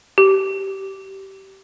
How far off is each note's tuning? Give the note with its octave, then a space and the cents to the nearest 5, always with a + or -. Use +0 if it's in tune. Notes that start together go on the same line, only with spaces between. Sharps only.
G4 -20